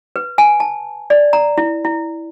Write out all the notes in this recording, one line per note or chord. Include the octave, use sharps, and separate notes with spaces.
B4
G#5
A5
D5
A#5
E4
E4